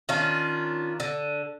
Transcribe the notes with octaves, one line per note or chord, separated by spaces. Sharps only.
D#3 C#4 D4 F4
D3